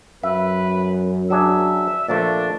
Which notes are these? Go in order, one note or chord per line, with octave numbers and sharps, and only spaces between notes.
F#2 B4 E5
F#3 D4 G#4 E5
A#2 F3 A3 D4